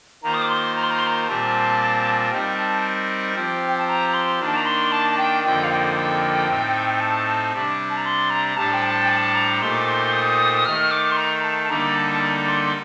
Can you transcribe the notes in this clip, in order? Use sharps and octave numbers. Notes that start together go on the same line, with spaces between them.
D#3 A#3 F4 C5 A#5
D#6
D6
C6
A#5
C6
A#5
C6
A#5
A#2 G3 C4 F4 A#4 A5
G3 C4 D#4 A#4 G5
A5
F3 C4 G4
G5
A5
A#5
A#5
C6
D#3 A#3 D4
A5
A#5
C6
A5
A5
G5
F2 D3 F3 A#3 D#4 G5
F5
G5
G5
A2 A3 C4 D#4
A5
C3 G3 D4
A5
A#5
C6
A#5
A2 G3 D4 A4 C5 A5
G5
A5
G5
A5
A#5
A#2 A3 D#4 G4 C5 C6
D6
C6
D#6
D#3 A3 D#4 F6
D6
C6
A#5
A5
A5
D3 G3 A#3 D#4 A4 A#5
A5
A5
A#5
C6
C6